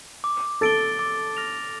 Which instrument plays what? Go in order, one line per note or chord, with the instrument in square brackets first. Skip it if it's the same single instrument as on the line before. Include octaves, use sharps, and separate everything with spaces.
[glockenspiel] D6
[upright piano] A4 [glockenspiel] A6 D7 G7
[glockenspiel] D6
F6 A#6 F7